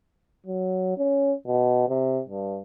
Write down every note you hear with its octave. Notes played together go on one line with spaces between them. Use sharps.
F#3
C#4
B2
C3
G2